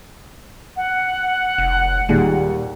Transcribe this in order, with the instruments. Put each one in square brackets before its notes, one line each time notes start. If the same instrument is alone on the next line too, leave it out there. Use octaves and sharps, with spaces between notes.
[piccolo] F#5
[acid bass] F1
[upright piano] D#2 G3 G#3 [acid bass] A#2